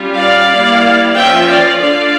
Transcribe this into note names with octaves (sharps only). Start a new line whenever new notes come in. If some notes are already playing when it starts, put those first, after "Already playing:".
Already playing: G3 C#4 F4
D5 F5
G3 A#3 E4
F3 A#3 C#4 F4 E5 G5
D5 F5
D3 A3 D4 F4 D5 F5